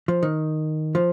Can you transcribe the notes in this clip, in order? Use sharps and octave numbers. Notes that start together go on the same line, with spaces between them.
F3
D#3
F3